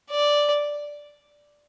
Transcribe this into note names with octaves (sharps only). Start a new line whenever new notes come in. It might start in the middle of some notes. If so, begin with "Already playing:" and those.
D5